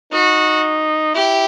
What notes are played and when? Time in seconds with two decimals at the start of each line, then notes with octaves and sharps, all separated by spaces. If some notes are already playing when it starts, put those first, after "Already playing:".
0.12 D#4 F#4
1.15 E4 G4